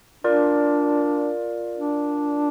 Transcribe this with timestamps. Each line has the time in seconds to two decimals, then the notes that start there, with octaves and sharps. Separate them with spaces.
0.24 D4 F4 A#4 D5 F5
1.77 D4